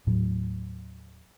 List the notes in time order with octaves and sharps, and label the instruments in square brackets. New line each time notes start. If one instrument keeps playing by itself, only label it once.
[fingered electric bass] D#2 A2 F#3